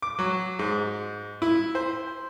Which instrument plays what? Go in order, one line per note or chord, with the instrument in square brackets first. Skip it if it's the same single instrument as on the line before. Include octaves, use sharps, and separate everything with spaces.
[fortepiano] D6
F#3
G#2
E4
C5